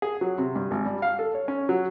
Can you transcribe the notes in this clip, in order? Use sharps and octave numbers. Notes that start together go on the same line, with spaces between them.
G#4
F#3
C3
G2
G#1
G3
F5
A4
C#5
C#4
F#3